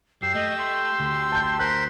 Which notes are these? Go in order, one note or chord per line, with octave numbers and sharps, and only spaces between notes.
F#2 G4 E6 C7
A3 D#5
C6
D2
A5 G6
A#4 C5 C6 F#6 B6